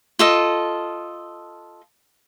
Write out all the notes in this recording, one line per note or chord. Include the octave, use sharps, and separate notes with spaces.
F4 A4 D#5